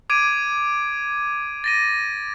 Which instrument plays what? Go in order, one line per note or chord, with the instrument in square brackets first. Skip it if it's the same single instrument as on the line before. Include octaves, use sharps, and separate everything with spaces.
[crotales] D6 G#6 D7 D#7
A6 A#6 D#7